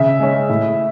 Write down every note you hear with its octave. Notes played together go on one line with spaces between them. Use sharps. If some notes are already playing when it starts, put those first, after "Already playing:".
Already playing: C#3 E5
G#3 C#4
A2